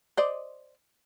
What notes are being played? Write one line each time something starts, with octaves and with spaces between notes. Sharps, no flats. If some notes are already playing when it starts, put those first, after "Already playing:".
C5 D5 D#5